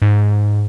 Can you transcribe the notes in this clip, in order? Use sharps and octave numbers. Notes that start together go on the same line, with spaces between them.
G#2